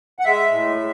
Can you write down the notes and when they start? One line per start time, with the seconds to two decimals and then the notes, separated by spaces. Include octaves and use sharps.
0.19 F#5
0.25 G#3 E5
0.51 A2
0.77 G#3